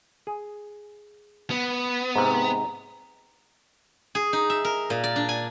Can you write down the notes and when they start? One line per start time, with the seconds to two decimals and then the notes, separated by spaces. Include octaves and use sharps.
0.27 G#4
1.50 B3
2.16 G#2 C3 A#5
4.15 G#4
4.33 D#4
4.50 E5
4.65 A#4
4.90 A#2
5.04 D5
5.16 D4
5.29 G#5